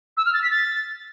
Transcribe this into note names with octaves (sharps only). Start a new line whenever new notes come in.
E6
F6
A6
B6
A6